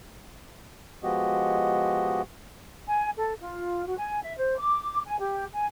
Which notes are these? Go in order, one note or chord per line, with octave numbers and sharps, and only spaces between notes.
F3 G#3 B3 F#4 G4 D#5
G#5
A4
F4
F#4
G#5
E5
C5
D6
G#5
G4
G#5